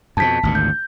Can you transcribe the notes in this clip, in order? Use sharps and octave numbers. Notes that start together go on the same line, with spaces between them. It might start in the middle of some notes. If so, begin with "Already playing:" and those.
F2 B2 A5 B6
G#1 D2 A#2
G6